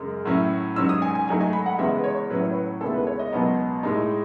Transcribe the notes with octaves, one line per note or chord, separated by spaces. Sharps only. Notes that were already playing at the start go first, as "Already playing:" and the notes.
Already playing: F#2 C#3 G#3
A2 F#3 C#4 E4
G#2 F#3 C#4 E6
D#6
G#5
G#5
G#2 F#3 A3 D#4 G#5
G#5
B5
F#5
E2 C#3 G#3 B3 E4 E5
B4
C#5
A2 F#3 C#4 E4 B4
C#5
B4
D#2 C#3 G#3 B3 E4 A4
B4
C#5
D#5
C#2 B2 F#3 B3 D#4
A2 G#3 D#4